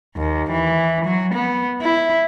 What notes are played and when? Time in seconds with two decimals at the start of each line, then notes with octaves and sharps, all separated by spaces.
0.16 D#2
0.51 E3
1.05 F#3
1.34 B3
1.82 E4